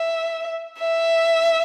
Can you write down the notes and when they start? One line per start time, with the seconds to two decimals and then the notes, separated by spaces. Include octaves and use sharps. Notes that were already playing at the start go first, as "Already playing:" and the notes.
Already playing: E5
0.79 E5